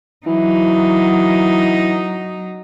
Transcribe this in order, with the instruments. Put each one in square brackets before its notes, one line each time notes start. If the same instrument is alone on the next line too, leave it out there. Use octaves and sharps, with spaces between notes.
[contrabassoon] E3 [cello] F#3 D#4